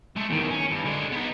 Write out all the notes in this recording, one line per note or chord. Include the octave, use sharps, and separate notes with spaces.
G#3 A3
E2 D#3
C#4
G2
D3 G#3
B3 D#4